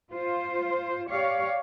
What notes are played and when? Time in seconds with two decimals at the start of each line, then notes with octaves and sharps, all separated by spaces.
0.10 F4 C5
1.10 G4 C#5 D5 F5